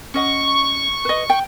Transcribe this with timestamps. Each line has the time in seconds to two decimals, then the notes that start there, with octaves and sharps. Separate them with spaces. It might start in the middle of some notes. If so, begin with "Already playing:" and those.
0.14 C#4 D#5 F#5 C#6
1.05 B4 D#5
1.30 G5